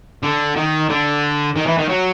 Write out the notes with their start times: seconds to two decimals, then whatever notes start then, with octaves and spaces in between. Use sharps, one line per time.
0.23 D3
0.56 D#3
0.89 D3
1.56 D#3
1.66 E3
1.78 D#3
1.89 F#3